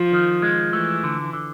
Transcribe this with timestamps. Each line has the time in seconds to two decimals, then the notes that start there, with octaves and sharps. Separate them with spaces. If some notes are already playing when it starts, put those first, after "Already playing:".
Already playing: F3
0.12 D#3
0.42 G#3
0.73 E3 A3
1.04 D3
1.33 D3